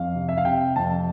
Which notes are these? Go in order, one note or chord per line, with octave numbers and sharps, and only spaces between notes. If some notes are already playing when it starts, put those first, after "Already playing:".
Already playing: F2 F5
C3
E5
F5
C3 G5
F2 A5